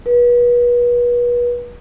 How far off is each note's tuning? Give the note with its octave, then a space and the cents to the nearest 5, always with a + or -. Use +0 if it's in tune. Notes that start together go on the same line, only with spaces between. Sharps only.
B4 -35